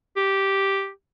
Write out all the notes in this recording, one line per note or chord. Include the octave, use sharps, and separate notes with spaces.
G4